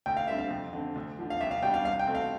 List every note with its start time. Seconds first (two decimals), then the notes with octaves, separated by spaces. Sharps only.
0.06 D2 G5
0.17 F5
0.27 D3 G3 C4 E5
0.38 F5
0.51 F2
0.73 D3 A3 C4
0.96 D2
1.18 D3 F3
1.30 F5
1.40 C2 E5
1.51 F5
1.62 B2 G3 D4 G5
1.74 F5
1.85 C2 F5
1.99 G5
2.07 B2 A3 C4
2.15 F5